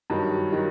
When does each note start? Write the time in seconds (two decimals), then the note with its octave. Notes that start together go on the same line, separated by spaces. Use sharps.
0.10 G2 D#3 F#3
0.52 D#3 F#3